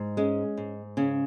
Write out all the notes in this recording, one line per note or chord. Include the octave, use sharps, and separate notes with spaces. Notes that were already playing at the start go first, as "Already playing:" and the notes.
Already playing: G#2
G#3 C#4
G#2
C#3 C#4